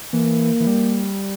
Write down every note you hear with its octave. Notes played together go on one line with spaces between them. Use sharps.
E3 A#3
E3
G3